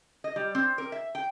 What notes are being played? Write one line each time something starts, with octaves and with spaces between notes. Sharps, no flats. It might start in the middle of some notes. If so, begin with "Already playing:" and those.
D#5
G3
C4
A#4
E5
G5